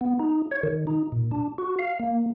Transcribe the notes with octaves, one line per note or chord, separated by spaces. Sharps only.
B3
D#4
C#5
D#3
D#4
A#2
D4
F#4
F5
A#3